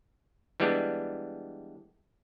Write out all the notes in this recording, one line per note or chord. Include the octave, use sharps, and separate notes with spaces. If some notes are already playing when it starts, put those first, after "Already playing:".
E3 G3 G#3 B3 D4